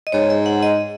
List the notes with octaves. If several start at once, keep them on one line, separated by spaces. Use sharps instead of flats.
D#5
G#2 C#5
D#5
F#5
D#5